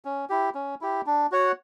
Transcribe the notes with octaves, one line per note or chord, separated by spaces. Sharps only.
C#4
E4 G4
C#4
E4 G4
D4
F#4 C#5 F#5